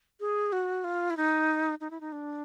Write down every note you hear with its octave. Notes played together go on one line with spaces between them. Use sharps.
G#4
F#4
F4
E4
D#4
D#4
E4
D#4
D4